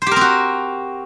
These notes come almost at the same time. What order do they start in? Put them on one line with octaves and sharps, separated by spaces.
C5 G4 A#4 C4 F#4